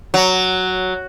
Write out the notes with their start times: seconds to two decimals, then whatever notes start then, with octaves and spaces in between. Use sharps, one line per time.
0.14 F#3